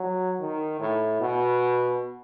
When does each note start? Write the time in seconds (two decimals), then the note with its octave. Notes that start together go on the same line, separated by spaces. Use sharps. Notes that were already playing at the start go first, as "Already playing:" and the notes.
Already playing: F#3
0.41 D#3
0.80 A2
1.21 B2